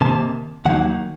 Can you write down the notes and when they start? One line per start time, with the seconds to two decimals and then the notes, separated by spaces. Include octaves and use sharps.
0.01 C3 D#3 A#3 A5
0.65 D#2 D#3 F#3 A#3 D#4 F#5